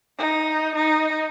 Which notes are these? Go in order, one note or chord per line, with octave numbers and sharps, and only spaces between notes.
D#4
D#4